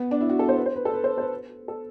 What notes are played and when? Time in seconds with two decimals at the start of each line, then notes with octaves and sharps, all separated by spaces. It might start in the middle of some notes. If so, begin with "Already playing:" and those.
Already playing: B3
0.11 D4
0.21 E4
0.29 F#4
0.39 A4
0.49 C5
0.57 B4
0.66 C5
0.76 B4
0.85 A4
0.94 B4
1.04 C5
1.18 C5
1.21 B4
1.68 A4